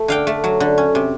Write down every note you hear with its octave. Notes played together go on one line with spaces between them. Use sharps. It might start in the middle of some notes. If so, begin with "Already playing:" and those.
Already playing: A3
D3 F5 G5
A3
F#3
D3
C#4
C3